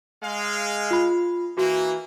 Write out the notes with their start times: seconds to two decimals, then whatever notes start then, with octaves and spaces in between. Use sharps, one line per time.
0.23 G#3 F5
0.91 F4 B5
1.58 E3 A#3 F#4